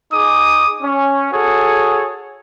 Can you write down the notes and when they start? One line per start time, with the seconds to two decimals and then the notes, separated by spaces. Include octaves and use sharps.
0.12 D#4 G#4 D6 D#6
0.81 C#4
1.32 F#4 G#4 A4 C#5